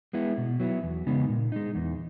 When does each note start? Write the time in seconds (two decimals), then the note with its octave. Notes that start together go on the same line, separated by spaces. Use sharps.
0.13 G#3 B3 E4
0.38 B2
0.60 F#3 B3 E4
0.83 E2
1.06 C#3 G#3 B3 D#4
1.29 A#2
1.52 G#3 D#4
1.75 E2